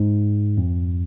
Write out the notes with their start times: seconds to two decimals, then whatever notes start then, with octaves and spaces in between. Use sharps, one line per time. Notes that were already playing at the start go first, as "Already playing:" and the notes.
Already playing: G#2
0.57 F2